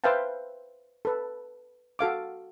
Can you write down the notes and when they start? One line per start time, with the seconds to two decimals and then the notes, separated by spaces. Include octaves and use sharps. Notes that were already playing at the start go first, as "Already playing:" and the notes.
0.04 B4 C5 E5 F5 G5 A5
1.05 A4 B4
1.99 F#4 A4 F5 D6